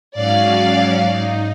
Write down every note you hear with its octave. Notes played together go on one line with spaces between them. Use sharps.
G#2 F#3 C#4 D5 F5
D#4